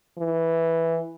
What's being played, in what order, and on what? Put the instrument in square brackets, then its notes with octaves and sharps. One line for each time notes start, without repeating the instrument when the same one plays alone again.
[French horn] E3